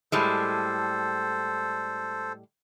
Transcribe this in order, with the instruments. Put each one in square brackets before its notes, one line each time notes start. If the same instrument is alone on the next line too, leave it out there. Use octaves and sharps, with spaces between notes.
[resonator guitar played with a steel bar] A2 G3 G#3 [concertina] A4 C5